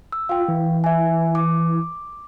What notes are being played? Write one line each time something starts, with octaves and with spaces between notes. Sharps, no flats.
E6
F4 F5 G5
E3
E5 G#5
D6